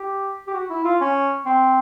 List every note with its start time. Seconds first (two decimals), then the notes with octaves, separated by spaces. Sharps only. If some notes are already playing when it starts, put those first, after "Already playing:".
Already playing: G4
0.47 G4
0.53 F#4
0.70 E4
0.84 F4
1.01 C#4
1.46 C4